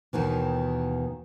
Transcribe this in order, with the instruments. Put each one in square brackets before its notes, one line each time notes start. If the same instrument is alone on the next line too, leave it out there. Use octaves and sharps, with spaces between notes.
[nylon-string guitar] D#2 B2 D#3 E3